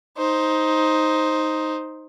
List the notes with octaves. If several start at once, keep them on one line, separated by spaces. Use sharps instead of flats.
D#4 C5